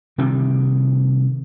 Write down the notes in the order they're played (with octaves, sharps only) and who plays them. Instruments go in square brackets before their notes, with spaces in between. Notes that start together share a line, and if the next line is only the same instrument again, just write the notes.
[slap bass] C3 D#3 G3